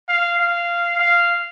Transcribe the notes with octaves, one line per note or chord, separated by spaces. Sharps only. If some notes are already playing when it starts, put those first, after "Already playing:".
F5
F5
F5